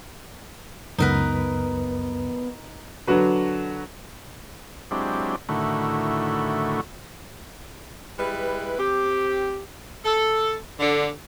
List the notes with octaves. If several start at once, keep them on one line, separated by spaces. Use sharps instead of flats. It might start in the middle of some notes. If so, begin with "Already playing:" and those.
C#2 F#2 B3 D#4 A#4 B4
D3 F#3 D4 F#4 B4
F#3 G#3 C4 D4 E4 G4
A2 D3 D#3 A3 E4 F#4
G3 G#3 E4 B4
C4 G4
A4
D3